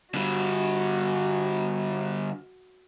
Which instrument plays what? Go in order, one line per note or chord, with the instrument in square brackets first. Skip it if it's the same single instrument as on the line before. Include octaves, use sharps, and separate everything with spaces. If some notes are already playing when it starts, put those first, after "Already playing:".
[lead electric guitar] D3 G3 [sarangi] F#4